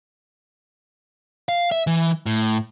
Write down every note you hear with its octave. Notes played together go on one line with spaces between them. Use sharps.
F5
E5
E3
A2